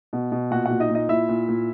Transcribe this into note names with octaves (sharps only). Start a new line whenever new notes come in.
B2
B2
A#2 F#4 F#5
A#2 F#4 F#5
D#4 D#5
A#2
D#4 D#5
A#2 E4 E5
A#2
A#2